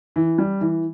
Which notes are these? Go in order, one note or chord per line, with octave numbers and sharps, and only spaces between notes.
E3
G3
E3